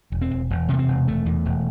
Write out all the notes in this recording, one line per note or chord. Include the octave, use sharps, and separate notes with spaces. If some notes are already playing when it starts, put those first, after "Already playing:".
E1
C4
E1
E1
C3 A3
C4
E1
E1 A3
E2
E1